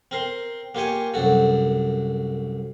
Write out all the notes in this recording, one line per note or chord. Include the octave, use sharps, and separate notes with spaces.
C4 A#4 C6
A#3 F4 G4 C#5 G#5
C2 F#2 F#4 A4